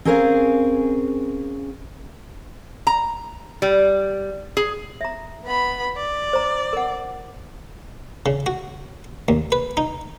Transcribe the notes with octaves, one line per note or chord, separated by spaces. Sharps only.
C4 C#4 G#4 A#4 C5 F5
A#5
G3
G#4
E5 A#5
B3 B5
D5
C5 A#5
A#4 F#5
C#3
F#4
D#2
B4
D#4